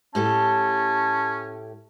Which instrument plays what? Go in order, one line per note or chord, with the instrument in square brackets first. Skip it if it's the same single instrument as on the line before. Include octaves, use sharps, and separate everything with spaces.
[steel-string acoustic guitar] A2 G4 A4 [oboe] C#4 [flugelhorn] A5